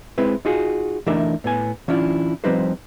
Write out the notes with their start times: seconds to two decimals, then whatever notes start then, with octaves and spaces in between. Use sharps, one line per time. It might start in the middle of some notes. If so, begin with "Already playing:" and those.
0.18 G#3 C4 E4 B4
0.45 D#4 F4 F#4 G#4
1.06 E3 A3 D4 D#4 A#4 E5
1.44 A2 B3 G#5
1.88 E3 C#4 D4 E4 F4
2.44 F3 G3 C4 D#4 B4 C5